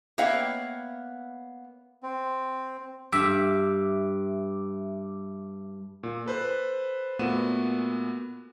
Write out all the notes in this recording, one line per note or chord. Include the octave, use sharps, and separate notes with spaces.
A#3 B3 C#5 E5 F5 G5
C4
G2 E5 D6
A#2
A4 B4 C5 F#6
A#2 A3 B3 F#4 D#7 E7